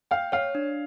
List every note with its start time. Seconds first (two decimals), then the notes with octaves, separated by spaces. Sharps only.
0.11 F5 G5
0.32 C#5 F5
0.55 D4